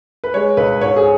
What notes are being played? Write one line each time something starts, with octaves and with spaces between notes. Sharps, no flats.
B4
G#3 C#5
C#2 B4
G#2 C#5
G#4